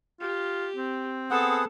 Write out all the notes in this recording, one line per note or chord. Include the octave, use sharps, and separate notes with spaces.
F4 G4
C4
B3 G#4 A4 F#5 A5